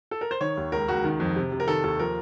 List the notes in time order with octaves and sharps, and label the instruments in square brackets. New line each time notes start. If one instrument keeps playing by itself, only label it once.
[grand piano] A4
A#4
C5
D#3 C#5
D#2
C#2 A#4
C#2 F#4
D#3
F2
C3
C3
A#4
D#3 A4
D#2 A4
F3 A#4